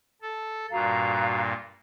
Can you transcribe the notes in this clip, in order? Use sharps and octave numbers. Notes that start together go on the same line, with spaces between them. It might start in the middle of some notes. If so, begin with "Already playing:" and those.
A4
G2 A#2 F#4 F5 A#5